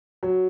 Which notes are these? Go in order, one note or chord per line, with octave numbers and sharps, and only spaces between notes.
F#3